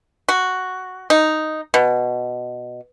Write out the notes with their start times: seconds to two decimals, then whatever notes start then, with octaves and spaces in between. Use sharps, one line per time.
0.29 F#4
1.10 D#4
1.74 B2